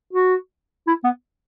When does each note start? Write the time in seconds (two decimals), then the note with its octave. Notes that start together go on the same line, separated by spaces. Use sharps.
0.13 F#4
0.87 E4
1.04 B3